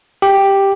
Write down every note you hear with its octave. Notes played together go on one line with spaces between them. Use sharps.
G4